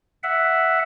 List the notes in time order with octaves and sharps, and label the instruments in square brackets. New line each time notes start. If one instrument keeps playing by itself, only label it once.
[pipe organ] E5 F#5